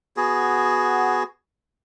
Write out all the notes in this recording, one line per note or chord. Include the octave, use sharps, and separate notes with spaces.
B3 F#4 G#4